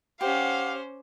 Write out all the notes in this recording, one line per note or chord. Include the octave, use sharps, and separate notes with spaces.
C#4 G4 C5 F5 F#5